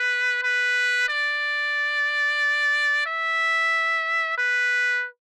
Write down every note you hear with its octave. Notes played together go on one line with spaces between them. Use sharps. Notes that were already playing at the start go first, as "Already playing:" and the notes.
Already playing: B4
B4
D5
E5
B4